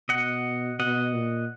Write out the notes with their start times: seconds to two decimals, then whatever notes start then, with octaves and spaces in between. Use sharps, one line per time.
0.09 B2 D#5 F#5
0.79 B2 D#5 F#5
1.14 A#2